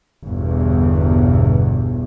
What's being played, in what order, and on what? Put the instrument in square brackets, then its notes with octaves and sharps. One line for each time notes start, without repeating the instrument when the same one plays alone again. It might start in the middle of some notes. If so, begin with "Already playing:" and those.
[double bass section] G1 E2 B2